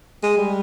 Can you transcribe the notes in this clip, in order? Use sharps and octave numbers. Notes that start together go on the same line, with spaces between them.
G#3
G3